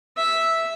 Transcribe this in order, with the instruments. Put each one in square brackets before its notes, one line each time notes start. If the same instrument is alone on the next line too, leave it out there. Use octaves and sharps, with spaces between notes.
[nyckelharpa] E5